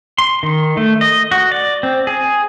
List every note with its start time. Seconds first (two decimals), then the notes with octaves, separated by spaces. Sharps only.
0.18 C6
0.43 D#3
0.77 A3
1.01 D#5
1.31 F#4
1.52 D5
1.83 C4
2.07 G#4